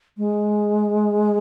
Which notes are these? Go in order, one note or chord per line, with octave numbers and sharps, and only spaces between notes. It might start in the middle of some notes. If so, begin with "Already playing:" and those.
G#3